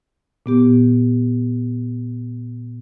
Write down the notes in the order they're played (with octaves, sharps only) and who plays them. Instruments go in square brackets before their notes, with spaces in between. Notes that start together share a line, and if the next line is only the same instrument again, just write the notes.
[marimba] A#2 B3 G4